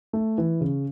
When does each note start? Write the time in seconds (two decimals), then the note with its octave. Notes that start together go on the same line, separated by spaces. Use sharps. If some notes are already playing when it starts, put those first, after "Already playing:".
0.13 A3
0.38 E3
0.61 C#3